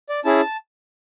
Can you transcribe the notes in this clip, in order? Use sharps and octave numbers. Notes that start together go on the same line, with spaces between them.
D5
C#4 E4 G#4 A5